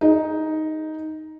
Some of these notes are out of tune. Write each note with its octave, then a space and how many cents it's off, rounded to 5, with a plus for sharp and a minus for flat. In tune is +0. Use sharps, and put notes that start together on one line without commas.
D#4 +5 G#4 +0